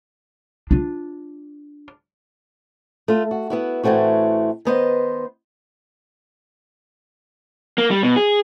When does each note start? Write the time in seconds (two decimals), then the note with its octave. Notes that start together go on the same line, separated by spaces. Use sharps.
0.71 D4 F4
3.08 A3 F4
3.31 F#4
3.50 B3 E4 F#4
3.83 A2 E3 A3 C4 F#4
4.65 D#3 B3 C5 D#5
7.78 A#3
7.91 G3
8.03 B2
8.16 G#4